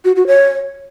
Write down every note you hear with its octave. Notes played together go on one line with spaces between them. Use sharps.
F#4
F#4
C#5